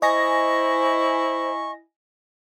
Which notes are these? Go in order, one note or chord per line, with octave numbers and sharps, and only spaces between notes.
E4 C5 D#5 G#5 C#6 A#6